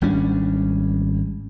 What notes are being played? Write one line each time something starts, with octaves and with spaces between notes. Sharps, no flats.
G#1 G3 C#4 D4